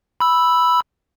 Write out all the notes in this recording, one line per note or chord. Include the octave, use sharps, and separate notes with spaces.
B5 E6